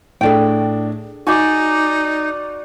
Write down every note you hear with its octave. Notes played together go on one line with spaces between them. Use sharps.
A2 D4 G#4 A4 G5
D#4 F#4 D5 G#5